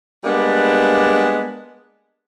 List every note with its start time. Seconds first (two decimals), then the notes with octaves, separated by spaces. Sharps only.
0.24 G3 G#3 A#3 B3 D4